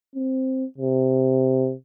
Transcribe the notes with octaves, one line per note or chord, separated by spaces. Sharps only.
C4
C3